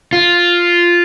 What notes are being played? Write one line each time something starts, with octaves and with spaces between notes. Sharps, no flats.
F4